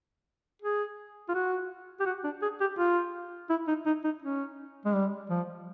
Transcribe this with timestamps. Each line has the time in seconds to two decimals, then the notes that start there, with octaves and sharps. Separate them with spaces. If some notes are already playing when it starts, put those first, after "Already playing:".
0.62 G#4
1.29 F4
1.35 F#4
2.00 G4
2.06 F#4
2.24 D4
2.42 G#4
2.60 G4
2.78 F4
3.50 E4
3.68 D#4
3.86 D#4
4.04 D#4
4.22 C#4
4.85 G#3
4.94 G3
5.30 F3